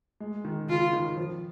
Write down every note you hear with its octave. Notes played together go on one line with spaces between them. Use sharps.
G#3
D#3
C#3 F4
D#3
F3